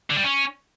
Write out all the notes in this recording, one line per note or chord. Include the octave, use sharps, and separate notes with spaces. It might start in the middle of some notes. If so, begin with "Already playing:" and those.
D3
G3
C#4